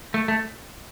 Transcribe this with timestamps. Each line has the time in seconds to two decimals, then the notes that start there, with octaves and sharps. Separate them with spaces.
0.14 A3
0.28 A3